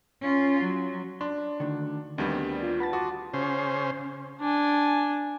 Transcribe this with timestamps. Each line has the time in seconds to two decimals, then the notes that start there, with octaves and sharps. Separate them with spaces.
0.21 C#4 F4
0.62 F#3
1.21 D4 C6
1.60 D2 D3 D#3
2.18 D2 D#3 G3 B3 C4 D4
2.63 F4
2.80 B4 F#5 A5 A6
2.93 F#4 C6 D6 D#6
3.33 C#3 C5
4.41 D4 G#5